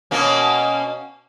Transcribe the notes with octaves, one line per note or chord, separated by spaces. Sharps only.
B2 A#3 C#4